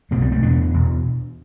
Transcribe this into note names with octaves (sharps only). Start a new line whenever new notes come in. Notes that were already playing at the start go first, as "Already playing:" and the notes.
C2 B2 A3 C4
G3 B3
A3 C4
E2 B2 B3 D4
E2 B2